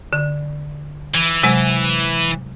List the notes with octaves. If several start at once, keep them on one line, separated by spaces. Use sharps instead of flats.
D3
E3
C3 F#3 G#3